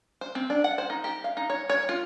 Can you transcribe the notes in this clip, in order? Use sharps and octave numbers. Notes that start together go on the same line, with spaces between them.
C5
C4
D4
F#5
C5
D#4
G4
F5
D#4
C#5
C#5
F4